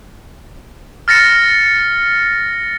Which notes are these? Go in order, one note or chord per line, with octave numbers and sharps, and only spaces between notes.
F6 A6 A#6 C#7